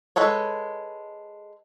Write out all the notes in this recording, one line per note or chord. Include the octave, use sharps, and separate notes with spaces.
G#3 A4 B4 C#5